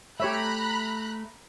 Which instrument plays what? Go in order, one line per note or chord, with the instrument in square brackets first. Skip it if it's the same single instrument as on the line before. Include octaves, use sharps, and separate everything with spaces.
[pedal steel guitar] A3 [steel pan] G4 C#5 E5 [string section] A#5 B5 F#6